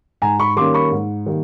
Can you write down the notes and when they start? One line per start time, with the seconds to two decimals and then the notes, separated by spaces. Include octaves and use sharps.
0.22 G#2 G#5 A#5
0.39 B5 C#6
0.56 D#3 G3 A#3 C#4 C6 D6
0.74 B5 C#6
0.92 G#2
1.26 D#3 G3 A#3